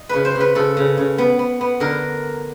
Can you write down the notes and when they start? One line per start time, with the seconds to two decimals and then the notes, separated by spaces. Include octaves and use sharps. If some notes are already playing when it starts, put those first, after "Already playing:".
Already playing: D#5
0.09 C#3 B4
0.25 C5
0.35 C#3
0.40 B4
0.55 C#3 A4
0.77 C#3
0.97 C#3
1.18 B3
1.39 B3
1.61 B3
1.80 D3 A#4